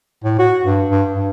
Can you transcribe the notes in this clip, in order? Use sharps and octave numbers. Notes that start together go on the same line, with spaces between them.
A2
F#4
G2
G2
G2